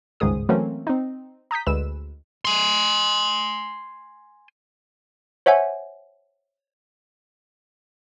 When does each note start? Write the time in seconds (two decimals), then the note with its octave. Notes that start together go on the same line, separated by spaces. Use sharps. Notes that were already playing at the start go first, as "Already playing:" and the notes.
0.20 G1 C#2 G#2 D#3 G#4 D#6
0.49 E3 F#3 A3 A#3 C4 C#4
0.87 C4 D#4
1.51 A#5 D#6 G6 B6
1.67 D2 G#3 B4 E6 E7
2.45 G#5 C6
5.46 C5 C#5 E5 F#5 G#5